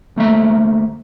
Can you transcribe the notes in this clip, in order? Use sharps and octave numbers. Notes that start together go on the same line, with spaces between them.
D2 A3 A#3 E5